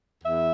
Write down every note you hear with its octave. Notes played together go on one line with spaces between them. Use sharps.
E2 E5